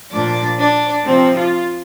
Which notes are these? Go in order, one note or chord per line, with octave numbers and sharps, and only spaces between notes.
A#2 F3 D4 D5
D4 D5
C3 F3 C4 C5
F4